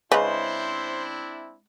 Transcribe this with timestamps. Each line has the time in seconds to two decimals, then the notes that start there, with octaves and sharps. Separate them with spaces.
0.12 C#3 G#3 C4 D4 E4 B4 C5